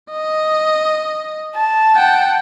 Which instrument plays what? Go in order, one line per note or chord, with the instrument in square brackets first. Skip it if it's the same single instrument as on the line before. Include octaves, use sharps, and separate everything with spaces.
[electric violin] D#5
[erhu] A5
[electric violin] F#5 G5